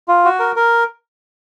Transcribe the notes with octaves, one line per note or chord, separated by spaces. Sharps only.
F4
F#4
A#4
A#4